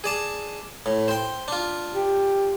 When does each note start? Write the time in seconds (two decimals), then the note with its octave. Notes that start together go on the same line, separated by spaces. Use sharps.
0.04 G#4 D5 A5
0.86 A2
1.08 C5 G5
1.48 D4 F4
1.95 G4